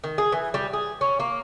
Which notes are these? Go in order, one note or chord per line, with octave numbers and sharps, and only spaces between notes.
D#3
G#4
E3
G3
G#4
C#4
A#3